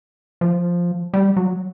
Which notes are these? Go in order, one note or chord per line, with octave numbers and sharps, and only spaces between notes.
F3
G3
F#3